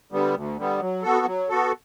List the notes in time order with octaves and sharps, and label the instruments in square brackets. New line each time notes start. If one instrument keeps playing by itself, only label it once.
[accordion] D3 G3 B3
D2
D3 G3 B3
F#3
B3 F#4 A4
F#3
B3 F#4 A4